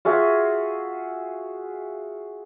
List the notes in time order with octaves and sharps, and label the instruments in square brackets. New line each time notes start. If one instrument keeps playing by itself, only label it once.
[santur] F4 F#4 G#4 E5